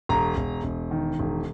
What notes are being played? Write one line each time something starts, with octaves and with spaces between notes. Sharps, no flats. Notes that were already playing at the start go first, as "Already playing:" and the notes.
E1 A#5
E1
E1
D#3
E1